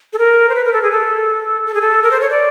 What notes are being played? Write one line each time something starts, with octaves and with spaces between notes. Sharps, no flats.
A4
A#4
C5
B4
A#4
A4
G#4
A4
A4
G#4
A4
A#4
C5
C#5
D5